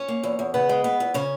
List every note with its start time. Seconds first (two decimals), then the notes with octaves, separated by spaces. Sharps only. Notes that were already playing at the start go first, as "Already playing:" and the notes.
Already playing: C#4 C#5
0.08 A#3
0.23 E2
0.39 E2
0.54 C#3 B3 B4
0.69 G#3
0.84 B3
1.00 E2
1.14 C#3 C#4 C#5